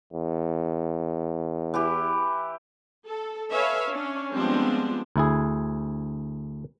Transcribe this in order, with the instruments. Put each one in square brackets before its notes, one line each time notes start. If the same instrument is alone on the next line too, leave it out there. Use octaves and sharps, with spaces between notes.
[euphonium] E2
[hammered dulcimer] E3 E4 G4
[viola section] A4
A4 B4 C#5 E5 F5 G#5
C#4 D4
F3 G3 G#3 B3 C4 D4
[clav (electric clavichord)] D2 E4 G#4